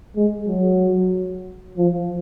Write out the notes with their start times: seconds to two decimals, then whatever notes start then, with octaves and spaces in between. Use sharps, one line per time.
0.16 G#3
0.47 F#3
1.77 F3